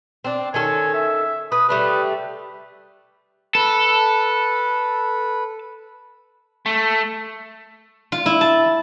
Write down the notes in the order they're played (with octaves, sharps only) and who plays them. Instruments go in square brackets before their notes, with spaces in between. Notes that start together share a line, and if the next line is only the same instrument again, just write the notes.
[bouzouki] C4 D4
[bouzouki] D#3 C#4 A4 [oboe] G#5
[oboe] E5
[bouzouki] B4 [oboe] D#6
[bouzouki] G3 A3 D4 [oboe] B4
[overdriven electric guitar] A4 [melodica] B4
[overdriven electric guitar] A3
[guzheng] F4
E4
A5